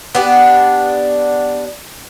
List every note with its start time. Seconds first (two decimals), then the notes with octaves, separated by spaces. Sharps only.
0.15 B3 D4 G4